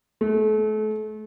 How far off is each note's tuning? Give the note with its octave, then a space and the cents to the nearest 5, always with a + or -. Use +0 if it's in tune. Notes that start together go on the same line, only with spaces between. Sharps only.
A3 -35